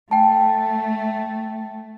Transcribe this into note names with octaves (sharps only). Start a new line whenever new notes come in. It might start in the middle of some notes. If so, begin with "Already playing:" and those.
A3 G5 A5